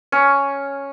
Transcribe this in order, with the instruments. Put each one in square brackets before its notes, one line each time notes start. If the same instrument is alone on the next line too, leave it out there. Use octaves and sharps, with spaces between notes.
[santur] C#4